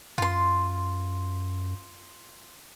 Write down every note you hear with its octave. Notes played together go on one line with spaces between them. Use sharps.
F#2 F4 C6